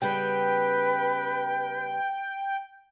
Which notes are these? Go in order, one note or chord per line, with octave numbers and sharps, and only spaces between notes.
C#3 G3 B3 B4 G5